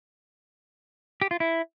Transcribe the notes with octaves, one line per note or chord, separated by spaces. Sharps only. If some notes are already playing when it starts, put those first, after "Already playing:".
G4
F4
E4